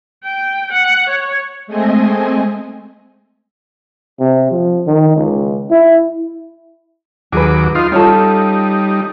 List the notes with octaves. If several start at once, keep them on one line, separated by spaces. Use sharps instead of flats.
G5
F#5
C#5
G#3 A3 C4 D#5 G#5
C3
F3
D#3
C#2
E4
D#2 F#3 G#4 B4 D6
D#4 F4 C6
G3 C#4 D#4 F4 A4